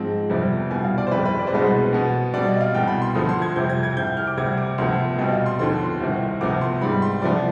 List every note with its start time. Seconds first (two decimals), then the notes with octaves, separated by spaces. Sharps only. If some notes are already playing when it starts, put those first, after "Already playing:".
Already playing: G#2 F3 G#3 C4
0.30 F2 C3 G3 B3
0.71 C2 B2 G3 B3 G#5
0.84 F5
0.98 D5
1.07 C5
1.11 F2 D#3 G3 C4 B4
1.25 B4
1.39 D5
1.47 C5
1.52 C2 B2 G#3 B3 B4
1.63 C5
1.93 B2 B3
2.33 B2 G3 C4 D5
2.48 D#5
2.61 F5
2.74 C2 B2 B3 G5
2.88 B5
3.02 C6
3.15 D2 D3 F3 D#6
3.29 C6
3.42 G#6
3.56 F2 C3 G3 G6
3.69 G#6
3.83 G#6
3.96 C2 C3 G3 G6
4.07 G6
4.17 F6
4.27 D6
4.37 D2 C3 G3 C4 G#6
4.58 D6
4.78 D2 C3 F3 B3 C6
5.19 B2 G3 C4 D#5
5.32 F5
5.46 C6
5.59 D#2 D3 F3 B3 C6
6.00 C2 C3 D#3
6.41 D2 C3 F3 B3 D6
6.61 C6
6.81 G#2 G3 C4 B5
6.92 B5
7.02 C6
7.22 C2 C3 F3 B3 D5